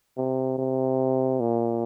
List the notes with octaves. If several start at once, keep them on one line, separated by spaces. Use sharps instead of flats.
C3
C3
A#2